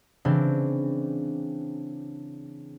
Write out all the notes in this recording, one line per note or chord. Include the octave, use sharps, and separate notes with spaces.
C#3 E3 C4 D4